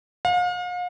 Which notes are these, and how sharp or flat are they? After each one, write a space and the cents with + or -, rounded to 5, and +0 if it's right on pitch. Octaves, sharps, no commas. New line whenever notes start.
F5 +40